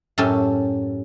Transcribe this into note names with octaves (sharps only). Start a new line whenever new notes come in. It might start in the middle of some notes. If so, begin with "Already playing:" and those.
F#2 A2 C#4 G4 A4 A5